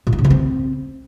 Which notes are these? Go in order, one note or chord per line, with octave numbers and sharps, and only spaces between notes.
A#2
D#4
C#3
E3
C4